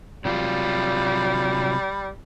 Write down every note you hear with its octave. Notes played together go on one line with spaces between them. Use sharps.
C3 F#3 G3 F4